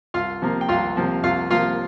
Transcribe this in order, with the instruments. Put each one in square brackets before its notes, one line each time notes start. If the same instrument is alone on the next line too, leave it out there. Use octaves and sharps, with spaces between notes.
[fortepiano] C2 F4 F5
C3 F3 A#3
G5
C2 F4 F5
C3 F3 A#3
C2 F4 F5
C3 F3 A#3 F4 F5